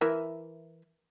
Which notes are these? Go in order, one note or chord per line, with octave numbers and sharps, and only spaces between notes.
E3 A#4 E5